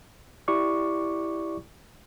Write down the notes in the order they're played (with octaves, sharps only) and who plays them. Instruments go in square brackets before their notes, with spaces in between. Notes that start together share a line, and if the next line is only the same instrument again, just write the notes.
[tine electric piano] E4 G4 D5 C#6 D6